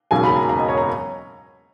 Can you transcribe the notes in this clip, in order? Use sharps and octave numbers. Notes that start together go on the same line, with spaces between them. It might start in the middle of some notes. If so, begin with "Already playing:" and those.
E1 D#2 C#3 F#3 G#5
B5
A#5
A#5
D#5
C#5
A#5